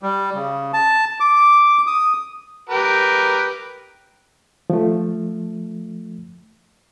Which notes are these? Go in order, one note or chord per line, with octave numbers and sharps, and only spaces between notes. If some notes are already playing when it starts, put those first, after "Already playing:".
G3
C#3
A5
D6
D#6
G4 A#4 B4
F3 A3